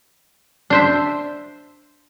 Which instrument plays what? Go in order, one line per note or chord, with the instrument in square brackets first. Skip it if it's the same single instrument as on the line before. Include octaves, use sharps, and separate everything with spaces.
[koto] D4 C5 E5